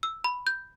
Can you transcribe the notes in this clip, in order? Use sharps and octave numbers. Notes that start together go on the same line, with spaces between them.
E6
B5
G6